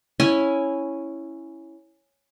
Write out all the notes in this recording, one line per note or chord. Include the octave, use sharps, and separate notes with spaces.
C#4 E4 G#5